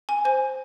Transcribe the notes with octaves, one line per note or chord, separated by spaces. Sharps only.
G#5
C5 G#5